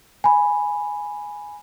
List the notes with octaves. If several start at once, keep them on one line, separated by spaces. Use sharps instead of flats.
G#5 B5